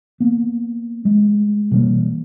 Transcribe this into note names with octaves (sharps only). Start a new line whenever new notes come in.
A#3 B3
G#3 A3
B2 E3 G3 A#3